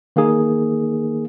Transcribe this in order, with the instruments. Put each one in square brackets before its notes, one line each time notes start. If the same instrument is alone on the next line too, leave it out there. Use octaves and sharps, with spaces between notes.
[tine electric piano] D#3 A#3 D#4 G#4